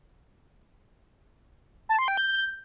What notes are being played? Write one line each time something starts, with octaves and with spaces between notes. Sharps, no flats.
A5
C6
G5
G6